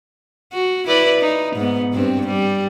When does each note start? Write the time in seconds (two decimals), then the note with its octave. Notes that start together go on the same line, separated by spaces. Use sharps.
0.53 F#4
0.87 E4 B4 D5
1.21 D#4
1.56 G#2 B3
1.93 G2 C4
2.26 G3